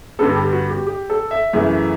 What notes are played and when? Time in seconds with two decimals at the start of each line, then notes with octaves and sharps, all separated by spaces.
0.19 G2 D3 G3 B3 A4
0.36 G4
0.53 F#4
0.70 G4
0.87 G4
1.10 A4
1.31 E5
1.53 F#2 C#3 E3 A3